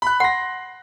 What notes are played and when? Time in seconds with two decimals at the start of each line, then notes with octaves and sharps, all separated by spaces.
0.02 B5 F#6
0.20 F#5 C6 A#6